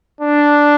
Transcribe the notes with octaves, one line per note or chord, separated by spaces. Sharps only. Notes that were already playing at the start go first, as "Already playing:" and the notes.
D4